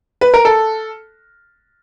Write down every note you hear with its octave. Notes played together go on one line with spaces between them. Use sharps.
B4
A#4
A4